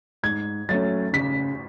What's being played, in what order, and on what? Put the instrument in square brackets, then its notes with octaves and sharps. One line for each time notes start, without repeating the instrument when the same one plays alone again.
[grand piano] G#2 [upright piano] G#6
[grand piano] F#3 A3 C#4 [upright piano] A6
[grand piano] C#3 [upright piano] B6